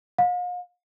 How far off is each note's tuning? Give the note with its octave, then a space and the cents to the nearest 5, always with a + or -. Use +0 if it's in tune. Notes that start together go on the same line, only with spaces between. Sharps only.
F5 +45